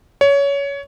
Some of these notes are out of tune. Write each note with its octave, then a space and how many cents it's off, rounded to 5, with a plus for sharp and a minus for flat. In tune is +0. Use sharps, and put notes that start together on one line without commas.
C#5 +20